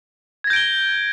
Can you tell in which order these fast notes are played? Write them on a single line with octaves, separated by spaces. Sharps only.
G#6 A#6 G6 D7 G7